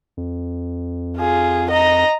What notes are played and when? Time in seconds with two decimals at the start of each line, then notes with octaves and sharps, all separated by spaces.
0.17 F2
1.18 F4 G#4
1.71 D#5 A#5